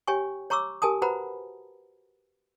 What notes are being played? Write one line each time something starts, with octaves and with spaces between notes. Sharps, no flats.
G4 C#5 G5 G#5 C#6
C#5 A#5 C#6 D6 E6
G4 A#4 G#5 A5 D#6
F#4 B4 C5 F#5 A#5 B5